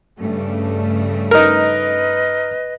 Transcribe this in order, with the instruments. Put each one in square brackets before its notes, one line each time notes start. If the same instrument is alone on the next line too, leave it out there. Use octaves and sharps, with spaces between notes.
[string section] G2 C#3 A3
[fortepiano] D#4 A#4 [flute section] B4 D#5